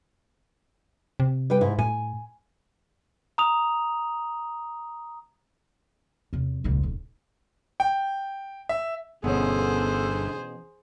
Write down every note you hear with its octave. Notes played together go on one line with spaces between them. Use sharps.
C3
G3 B4 G5
G#2 E4
A2 G#5
A#5 D#6 F7
E2 C3
D#1 C#2
D#1
G5
E5
G1 B2 D3 E3 C#4 G#4 A4 C5